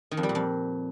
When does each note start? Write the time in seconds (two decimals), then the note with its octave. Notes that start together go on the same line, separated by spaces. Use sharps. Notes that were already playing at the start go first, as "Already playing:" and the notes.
0.11 D#3
0.17 F2
0.23 G3
0.29 A#2
0.35 F2